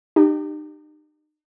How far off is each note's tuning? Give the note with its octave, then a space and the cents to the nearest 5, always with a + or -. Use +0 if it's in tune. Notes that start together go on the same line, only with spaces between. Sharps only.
D#4 -40 G4 +0